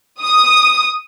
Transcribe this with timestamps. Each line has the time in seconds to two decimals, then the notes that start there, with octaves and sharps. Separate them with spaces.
0.22 D#6